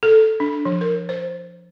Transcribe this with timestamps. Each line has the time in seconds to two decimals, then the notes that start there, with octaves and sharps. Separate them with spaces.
0.03 A4
0.40 D4
0.65 F3
0.81 A#4
1.09 C5